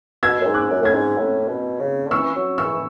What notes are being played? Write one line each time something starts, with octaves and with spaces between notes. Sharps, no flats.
B2 E6 G#6
F#2
G#2
D6 F#6
F#2
A2 E6 G#6
G#2
A2
B2
C#3
D3
E3 C#6 E6
E3
F#3
E3 C#6 E6